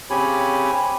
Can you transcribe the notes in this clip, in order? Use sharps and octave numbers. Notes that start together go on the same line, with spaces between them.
C#3 C4 G4 C#5 G#5 B5